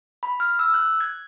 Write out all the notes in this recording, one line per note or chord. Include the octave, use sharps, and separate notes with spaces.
B5
F6
E6
F#6
G#6